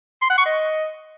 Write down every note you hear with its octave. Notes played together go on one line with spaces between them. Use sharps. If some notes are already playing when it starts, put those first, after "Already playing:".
C6
F#5
C#6
D#5